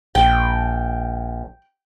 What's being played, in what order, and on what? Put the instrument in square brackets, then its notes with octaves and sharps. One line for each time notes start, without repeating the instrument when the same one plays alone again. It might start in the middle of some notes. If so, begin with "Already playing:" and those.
[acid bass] A#1 [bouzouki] G5